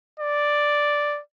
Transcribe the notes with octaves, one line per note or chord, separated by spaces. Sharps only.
D5